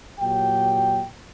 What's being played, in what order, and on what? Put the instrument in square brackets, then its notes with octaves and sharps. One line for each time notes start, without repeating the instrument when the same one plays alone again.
[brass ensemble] A#2 F#3 G4 G5